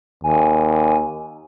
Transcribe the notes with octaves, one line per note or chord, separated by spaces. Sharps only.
D#2 G#5